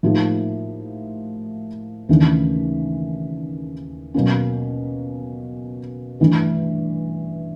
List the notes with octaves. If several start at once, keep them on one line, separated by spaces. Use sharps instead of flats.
A2 F3 A#3 D#4 G4
D#2 C#3 E3 A3 D4
B2 F#3 A#3 C#4
G2 E3 A3 D4